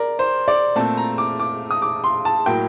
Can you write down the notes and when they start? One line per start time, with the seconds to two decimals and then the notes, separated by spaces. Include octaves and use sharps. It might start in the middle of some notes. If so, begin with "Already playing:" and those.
Already playing: A#4 D5
0.19 C5
0.48 D5
0.76 A#2 A3 C4 A5
0.97 A#5
1.18 D6
1.40 D6
1.71 D#6
1.82 D6
2.04 C6
2.25 A5
2.46 A2 F#3 A#3 G5